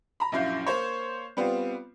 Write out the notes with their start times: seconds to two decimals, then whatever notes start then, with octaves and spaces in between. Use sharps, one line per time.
0.20 A#5 B5
0.32 A#1 F#2 E4 F5 G6
0.67 A#3 C5 C#5
1.37 G3 B3 C4 F4